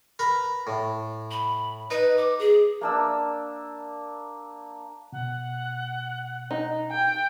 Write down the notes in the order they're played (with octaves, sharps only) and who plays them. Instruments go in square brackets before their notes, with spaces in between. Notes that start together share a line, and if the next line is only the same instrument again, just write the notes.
[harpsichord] A#4 B4 B5
A2
[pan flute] B5
[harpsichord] D#4 [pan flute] B4
[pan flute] D6
G#4
[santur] A#3 D4 E6
[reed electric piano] B2 [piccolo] F#5
[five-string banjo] D#4
[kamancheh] G5